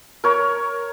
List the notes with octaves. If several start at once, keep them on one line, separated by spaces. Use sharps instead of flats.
A#4 C#5